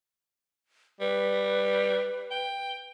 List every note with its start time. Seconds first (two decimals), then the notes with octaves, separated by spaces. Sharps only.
1.01 G3 B4
2.31 G5